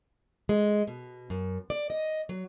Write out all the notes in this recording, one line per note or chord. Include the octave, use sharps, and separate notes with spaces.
G#3
B2
F#2
D5
D#5
F#3